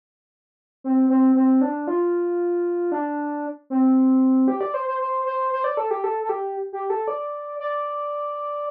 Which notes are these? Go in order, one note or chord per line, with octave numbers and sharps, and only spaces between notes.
C4
C4
C4
D4
F4
D4
C4
G4
D5
C5
C5
C5
C5
C5
D5
A4
G4
A4
A4
G4
G4
A4
D5
D5